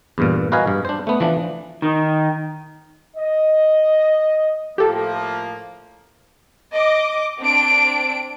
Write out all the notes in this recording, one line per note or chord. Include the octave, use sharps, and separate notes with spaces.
E2 G2 A#2
F#4 A#4 B4 D#5 F5 G#5
G2
D4 C5
A3 B3
E3 F3 D4
D#3
D#5
A2 F3 A#3 G4 A4
D#5 D6
C4 D4 D7